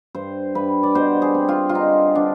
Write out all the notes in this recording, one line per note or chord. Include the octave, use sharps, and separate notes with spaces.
G2 C5
G2 B4
D5
B2 C5
G#4
C4
F4
F4
D3 D#4
D3 D4